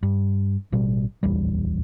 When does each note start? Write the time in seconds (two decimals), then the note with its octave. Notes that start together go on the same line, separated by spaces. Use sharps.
0.03 G2
0.72 A1 B2 G3
1.23 D1 A#1 E2 G3